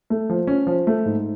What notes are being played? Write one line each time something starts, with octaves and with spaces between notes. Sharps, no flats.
A3
F3
C#4
F3
A3
G#2